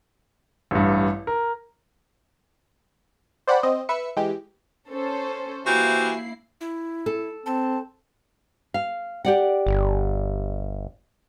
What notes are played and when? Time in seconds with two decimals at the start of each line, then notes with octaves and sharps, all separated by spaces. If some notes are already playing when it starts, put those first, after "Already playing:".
0.71 A1 G2
1.27 A#4
3.48 C5 D5 F#5 G5 B5
3.63 C4 D#5
3.89 B4 E5 C#7
4.17 E3 G#3 G4
4.89 C#4 A4 C5
5.67 E3 A#3 E4 F#4 G4 C5 C7
6.61 E4
7.06 A4
7.46 C4 A5
8.74 F5
9.25 G4 D5 F#5
9.67 G1